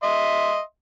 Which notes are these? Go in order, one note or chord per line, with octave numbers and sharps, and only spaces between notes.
D#5 E5 C6